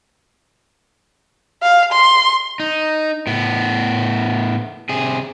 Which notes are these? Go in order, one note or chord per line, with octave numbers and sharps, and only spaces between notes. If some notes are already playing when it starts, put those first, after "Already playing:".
F5
C6
D#4
A2 B3
C3 G#4